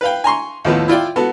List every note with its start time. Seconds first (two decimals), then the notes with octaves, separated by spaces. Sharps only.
0.01 B4 F5 G5
0.24 G#5 A#5 C6 C#6
0.65 D#2 A2 F3 B3
0.88 E4 F4 D5 G5
1.16 B3 F#4 A4